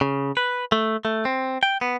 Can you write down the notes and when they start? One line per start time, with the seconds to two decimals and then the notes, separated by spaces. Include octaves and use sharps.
0.01 C#3
0.37 B4
0.72 A3
1.05 A3
1.25 C4
1.63 G5
1.81 B3